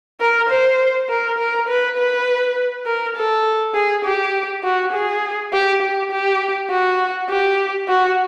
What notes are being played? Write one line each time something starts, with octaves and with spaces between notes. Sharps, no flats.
A#4
C5
A#4
A#4
B4
B4
A#4
A4
G#4
G4
F#4
G#4
G4
G4
G4
F#4
G4
F#4